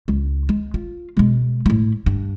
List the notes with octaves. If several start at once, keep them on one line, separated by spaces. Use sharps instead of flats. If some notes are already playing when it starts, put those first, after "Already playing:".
C#2
G#3
F4
B2 G#3
A2 E4
G2